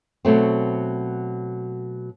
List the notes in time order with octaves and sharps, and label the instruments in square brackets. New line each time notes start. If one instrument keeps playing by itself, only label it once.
[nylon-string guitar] B2 F#3 A3 C4